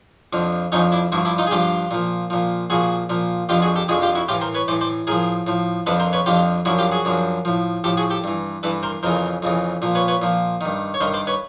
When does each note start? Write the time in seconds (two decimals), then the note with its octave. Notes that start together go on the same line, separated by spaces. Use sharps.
0.33 F2 D3 F3
0.72 F2 D3 F3 C#4 D#4
0.92 D4 E4
1.12 G2 D3 F3 E4 F#4
1.25 D4 E4
1.38 D#4 F4
1.47 G#4
1.51 G2 D3 F3 F4 G4
1.91 A#2 F3
2.30 A#2 F3
2.70 A#2 F3 F#4 G#4
3.10 A#2 F3
3.49 F2 D3 F3 F4 G4
3.62 F#4 G#4
3.76 G4 A4
3.89 F2 D3 F3 F#4 G#4
4.02 F4 G4
4.15 E4 F#4
4.28 A2 E3 F4 G4
4.41 A#4 C5
4.55 B4 C#5
4.68 A2 E3 C5 D5
4.81 C5 D5
5.07 A2 F3 G#4 A#4
5.47 A2 F3
5.86 F2 D3 F3 A4 B4
6.00 A#4 C5
6.13 B4 C#5
6.26 F2 D3 F3 F4 G4
6.65 F#2 D3 F3 E4 F#4
6.78 F4 G4
6.92 F#4 G#4
7.05 F#2 D3 F3
7.45 A2 F3
7.84 A2 F3 G4 A4
7.97 F#4 G#4
8.10 G4 A4
8.24 G2 E3
8.63 G2 E3 A4 B4
8.83 A#4 C5
9.03 F2 C#3 E3 A#4 C5
9.42 F2 C#3 E3
9.82 A#2 F3
9.95 B4 C#5
10.08 B4 C#5
10.22 A#2 F3
10.61 G2 D#3
10.94 C#5
11.01 G2 D#3 A#4 C5
11.14 C5 D5
11.27 B4 C#5